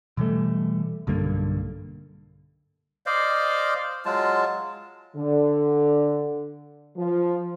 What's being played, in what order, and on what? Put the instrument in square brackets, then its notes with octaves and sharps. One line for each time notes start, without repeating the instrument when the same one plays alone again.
[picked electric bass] B2 E3 G3 A3
B1 G2 D3 A#3
[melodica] C5 D5 D#5 F5
F#3 G#3 F4 A5
[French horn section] D3
F3